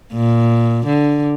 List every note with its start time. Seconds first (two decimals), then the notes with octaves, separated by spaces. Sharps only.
0.13 A#2
0.86 D3